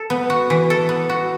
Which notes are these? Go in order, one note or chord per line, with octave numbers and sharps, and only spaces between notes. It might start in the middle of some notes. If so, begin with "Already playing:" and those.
Already playing: A4
B3
F#4
E3
A4
B3
F#4